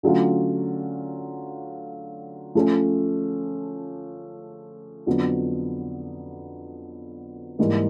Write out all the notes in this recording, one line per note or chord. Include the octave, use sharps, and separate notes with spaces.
D3 F#3 A3 C#4 F4
F3 A3 C#4
F2 D3 F#3 B3
G#2 E3 G3 A#3